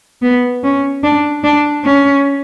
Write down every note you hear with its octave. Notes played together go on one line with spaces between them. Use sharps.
B3
C#4
D4
D4
C#4